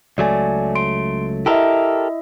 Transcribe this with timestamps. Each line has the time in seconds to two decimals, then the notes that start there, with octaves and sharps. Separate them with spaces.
0.18 C#2 F#3 A3 D5 G#5
0.75 C6 D7
1.46 E4 G4 A4 A#4 D#5 E5